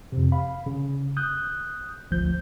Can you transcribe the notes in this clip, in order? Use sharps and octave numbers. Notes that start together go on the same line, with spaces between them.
F2 C3
F5 B5
C#3
D#6 F#6 G6
G#1 D2 F3 G6